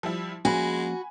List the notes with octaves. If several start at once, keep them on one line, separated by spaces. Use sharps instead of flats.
F3 G3 E4
F3 G#3 A#3 C#4 F#4 G#5 B5